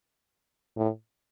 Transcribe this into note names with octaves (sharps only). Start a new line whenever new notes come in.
A2